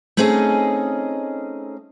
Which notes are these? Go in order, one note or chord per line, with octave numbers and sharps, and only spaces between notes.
A3 C4 C#4 D#4 G#4 D#5